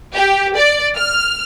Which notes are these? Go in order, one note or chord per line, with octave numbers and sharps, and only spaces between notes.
G4
D5
F6